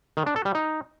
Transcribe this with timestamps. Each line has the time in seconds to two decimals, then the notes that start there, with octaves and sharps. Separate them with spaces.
0.17 D#3
0.26 D4
0.36 A4
0.45 G3
0.55 D#4